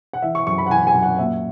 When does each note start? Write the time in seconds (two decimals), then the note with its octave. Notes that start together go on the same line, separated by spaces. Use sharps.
0.13 F#5
0.22 E3 E5
0.35 C#6
0.47 F#2 C#6
0.58 B5
0.66 F#5
0.70 E3 G#5
0.87 G#5
0.94 F#2
1.02 F#5
1.19 A#2 E5